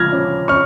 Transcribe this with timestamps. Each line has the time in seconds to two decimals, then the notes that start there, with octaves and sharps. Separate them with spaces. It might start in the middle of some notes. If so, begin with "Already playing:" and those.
Already playing: F3 F6 G#6 A#6
0.12 C#4
0.48 C#4 C#6 F6